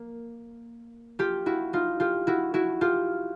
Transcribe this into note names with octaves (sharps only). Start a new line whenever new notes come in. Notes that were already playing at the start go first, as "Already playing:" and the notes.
Already playing: A#3
F4 G4
E4 F#4
D#4 F4
F4 G4
E4 F#4
E4 F#4
F4 G4